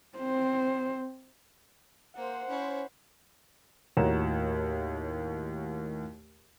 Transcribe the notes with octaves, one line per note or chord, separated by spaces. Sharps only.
C4 C5
A#3 C5 F#5
C#4 E4 C#5
D#2 A2 F#4 C#5 A#5 E7